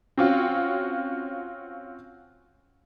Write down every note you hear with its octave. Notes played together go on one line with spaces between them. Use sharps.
C4 C#4 F4 F#4